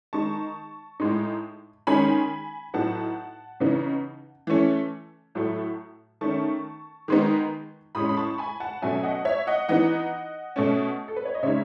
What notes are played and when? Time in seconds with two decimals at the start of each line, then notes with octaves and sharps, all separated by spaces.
0.13 D#3 G#3 D#4 A5 C#6
1.00 A2 G#3 D#4
1.87 D#3 G#3 C#4 G#5 B5
2.74 A2 F#3 B3 D#4 F#5 A5
3.60 C#3 E3 B3 D#4
4.47 E3 A3 C#4
5.35 A2 F#3 A3
6.21 D#3 A3 C#4 A5 C#6
7.08 D#3 G#3 B3 D#4
7.95 A2 G#3 C#4 B5 D#6
8.09 B5
8.17 A5 C#6
8.38 G#5 B5
8.60 F#5 A5
8.82 B2 F#3 A3 C#4 E5 G#5
9.03 D#5 F#5
9.25 C#5 E5
9.47 D#5 F#5
9.68 E3 B3 D#4 D#5 F#5
10.56 B2 A3 C#4
11.08 A4
11.16 B4
11.25 C#5
11.34 D#5
11.43 C#3 G#3 D#4 C#5 E5